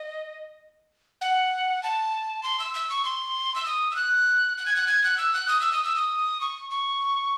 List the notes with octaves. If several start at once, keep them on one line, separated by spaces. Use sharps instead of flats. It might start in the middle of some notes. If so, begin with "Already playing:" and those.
Already playing: D#5
F#5
A5
C6
E6
E6
C#6
C6
E6
D#6
E6
F#6
F#6
G#6
F#6
G#6
F#6
E6
F#6
D#6
E6
D#6
E6
D#6
C#6
C#6